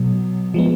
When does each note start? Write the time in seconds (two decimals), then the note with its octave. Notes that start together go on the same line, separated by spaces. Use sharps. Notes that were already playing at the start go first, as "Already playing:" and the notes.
Already playing: B2 F#3 B3
0.54 F3 G#3 B3